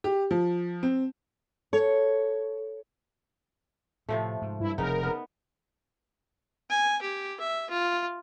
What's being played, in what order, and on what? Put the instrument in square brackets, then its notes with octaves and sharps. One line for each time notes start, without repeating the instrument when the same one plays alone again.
[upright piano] G4
F3
C4
[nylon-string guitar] A4 [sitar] C#5
[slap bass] A2 [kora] C3 F3 A3
[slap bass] G#2
[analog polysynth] G2 E4
[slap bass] F1 [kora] C#3 B3 D#4 [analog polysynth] A#4
[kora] B3
[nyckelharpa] G#5
G4
E5
F4